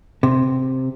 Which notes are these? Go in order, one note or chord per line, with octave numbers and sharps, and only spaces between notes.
C3